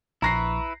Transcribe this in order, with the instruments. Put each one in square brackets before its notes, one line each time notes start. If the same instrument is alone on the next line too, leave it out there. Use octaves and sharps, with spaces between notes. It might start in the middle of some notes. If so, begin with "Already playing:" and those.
[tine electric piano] A#1 C#6 [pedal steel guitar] E4 B4 [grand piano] A#5 A#6 C7